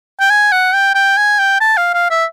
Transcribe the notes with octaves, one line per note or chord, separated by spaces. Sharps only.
G5
G#5
F#5
G5
G5
G#5
G5
A5
F5
F5
E5